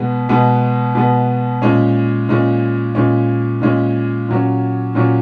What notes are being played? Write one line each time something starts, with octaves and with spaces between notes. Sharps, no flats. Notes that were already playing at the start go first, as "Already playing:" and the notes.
Already playing: B2 G#3 B3
B2 G#3 B3
B2 G#3 B3
A#2 G#3 C#4
A#2 G#3 C#4
A#2 G#3 C#4
A#2 G#3 C#4
A#2 F#3 C#4
A#2 F#3 C#4